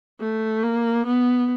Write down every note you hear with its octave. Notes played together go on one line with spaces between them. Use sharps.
A3
A#3
B3